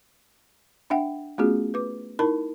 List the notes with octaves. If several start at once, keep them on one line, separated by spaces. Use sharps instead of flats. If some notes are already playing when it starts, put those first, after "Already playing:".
D4 E5 F#5 G5
A3 B3 C#4 F4 F#4 G#4
B4 D6
D#4 E4 A#4 A5 B5